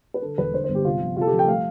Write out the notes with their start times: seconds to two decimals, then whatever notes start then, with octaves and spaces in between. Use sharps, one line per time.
0.14 B4
0.22 D3 A4
0.38 E1 B4
0.54 D3 C5
0.64 C5
0.69 G1
0.75 G4
0.85 C3 F4
1.00 F3
1.16 C3 F4 A4
1.27 G4
1.32 F3
1.39 G5
1.48 A3 F5